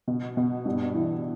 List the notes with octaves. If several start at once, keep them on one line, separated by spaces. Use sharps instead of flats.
B2
B2
G2
E3